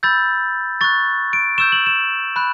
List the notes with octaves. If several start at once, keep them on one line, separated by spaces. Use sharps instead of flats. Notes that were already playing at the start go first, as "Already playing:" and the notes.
B5 E6 G6 A6
C#6 F#6 A6
D7
C#6 E6 G6 E7
F#7
E7
B5 F#6